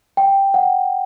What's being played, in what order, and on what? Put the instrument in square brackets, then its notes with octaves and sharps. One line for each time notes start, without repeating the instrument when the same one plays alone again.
[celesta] G5
F#5